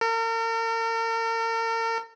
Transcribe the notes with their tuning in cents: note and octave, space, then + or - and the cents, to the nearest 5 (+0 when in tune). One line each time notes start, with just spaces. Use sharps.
A#4 -40